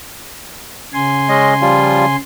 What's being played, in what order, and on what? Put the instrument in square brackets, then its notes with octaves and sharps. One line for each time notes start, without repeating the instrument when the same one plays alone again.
[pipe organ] C#3 G#5 C6
[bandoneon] G#3 C#4 D#5
F3 G3 F4